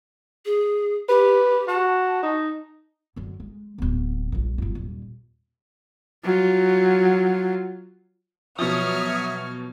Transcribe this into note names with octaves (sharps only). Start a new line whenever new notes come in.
G#4
G4 B4
F#4 A5
D#4
F#2 D3
G#3
D1 B3
A#1 G2
G1 F#2
D#1
F#3 F4
B2 F3 F#3 C#5 E5 D#6 F6